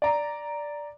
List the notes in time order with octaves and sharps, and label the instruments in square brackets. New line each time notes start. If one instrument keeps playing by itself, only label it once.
[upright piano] D5 A#5